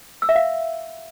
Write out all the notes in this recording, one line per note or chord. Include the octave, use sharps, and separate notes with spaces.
E6
E5
F5